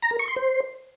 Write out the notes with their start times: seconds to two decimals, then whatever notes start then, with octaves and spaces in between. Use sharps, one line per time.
0.02 A#5
0.11 A#4
0.19 C#6
0.28 C6
0.36 C5